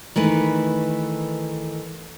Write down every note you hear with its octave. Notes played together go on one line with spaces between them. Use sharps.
D#3 E3 A3 B4